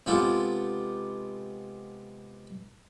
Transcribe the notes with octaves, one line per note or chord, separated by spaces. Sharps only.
C3 G#3 B3 F4 G4 A4